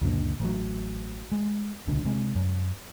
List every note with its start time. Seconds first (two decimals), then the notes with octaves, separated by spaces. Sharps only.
0.01 C#2 F#2 A#2 D3
0.40 A1 F#3
1.32 G#3
1.87 D#1 C#2 B2 D3
2.05 C3 G#3
2.35 F#2